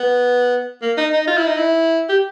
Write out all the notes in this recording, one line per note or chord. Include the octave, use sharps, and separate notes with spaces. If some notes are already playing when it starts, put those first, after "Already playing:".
Already playing: B3
A#3
D#4
D#4
F4
E4
D#4
E4
G4